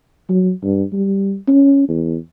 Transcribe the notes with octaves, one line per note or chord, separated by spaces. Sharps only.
F#3
G2
G3
C#4
E2